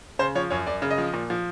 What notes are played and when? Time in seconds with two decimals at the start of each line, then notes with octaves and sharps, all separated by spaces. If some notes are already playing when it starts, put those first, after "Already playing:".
0.19 C#3 C5
0.35 F3 C#5
0.51 F#2 C#5
0.67 F#2 D5
0.82 C#3
0.91 D#5
0.98 F3
1.14 A#2
1.30 F3